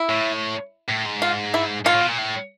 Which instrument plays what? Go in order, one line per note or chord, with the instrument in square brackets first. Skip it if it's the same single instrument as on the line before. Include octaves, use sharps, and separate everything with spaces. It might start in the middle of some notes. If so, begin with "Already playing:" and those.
Already playing: [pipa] E4
[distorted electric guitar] A2
A2
G#2
[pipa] F4
E4
[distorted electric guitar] G#2 [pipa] F4
[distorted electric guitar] A2
B2
A#2
A2